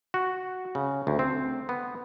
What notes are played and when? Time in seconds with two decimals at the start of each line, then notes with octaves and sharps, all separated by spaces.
0.14 F#4
0.75 C#3
1.07 D2
1.19 C4
1.69 B3